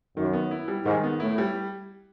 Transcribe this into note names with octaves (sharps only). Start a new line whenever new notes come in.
F#2 D#3
B3
E4
G3
G#2 D#3
B3
A2 E4
G3